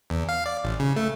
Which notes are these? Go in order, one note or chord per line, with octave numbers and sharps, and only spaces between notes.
E2
F5
D5
A1
C#3
A3